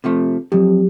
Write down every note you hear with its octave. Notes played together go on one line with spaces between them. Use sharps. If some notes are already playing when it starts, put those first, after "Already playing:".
C3 F3 A3
F2 F#3 G4